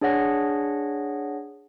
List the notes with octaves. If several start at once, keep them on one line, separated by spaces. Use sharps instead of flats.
D4 G#4 C#5 F#5 A#6